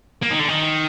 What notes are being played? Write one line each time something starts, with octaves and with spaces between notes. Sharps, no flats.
A#3
D#3
D3
D#3